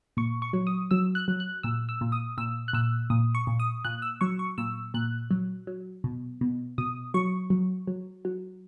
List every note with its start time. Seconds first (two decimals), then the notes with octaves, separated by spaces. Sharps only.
0.17 A#2 C#6
0.42 C#6
0.53 F#3
0.67 D#6
0.91 F#3 E6
1.15 F#6
1.28 F#3
1.40 F#6
1.63 A#2 E6
1.89 E6
2.01 A#2
2.12 D#6
2.38 A#2 E6
2.68 F#6
2.73 A#2 E6
3.10 A#2 D#6
3.35 C#6
3.47 A#2
3.60 D#6
3.85 A#2 F#6
4.02 E6
4.21 F#3 C#6
4.39 C#6
4.58 A#2 E6
4.94 A#2 F#6
5.31 F#3
5.67 F#3
6.04 B2
6.41 B2
6.78 B2 D#6
7.14 F#3 C#6
7.50 F#3
7.87 F#3
8.25 F#3